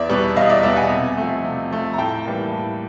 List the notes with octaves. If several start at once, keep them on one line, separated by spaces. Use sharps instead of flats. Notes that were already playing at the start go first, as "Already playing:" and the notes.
Already playing: E2 D5 E5
B2 G3 B3
E2 D#5 F5
D5 E5
B2 G3 B3 D5 E5
F#5 G#5
C3
F3 A3
C3
F3 A3
A#5
A2 G5 A5
E3 G3 A#3
A2